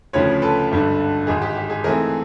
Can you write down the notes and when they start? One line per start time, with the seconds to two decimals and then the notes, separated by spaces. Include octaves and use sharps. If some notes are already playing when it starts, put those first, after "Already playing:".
0.13 D2 C#3 F3 B4 C#5
0.42 A4 B4
0.71 G#1 G2 D3
1.27 G#1 G#2 D#3 G#4
1.42 G4
1.56 G4
1.70 G#4
1.84 G#2 E3 A3 C4 G#4 A#4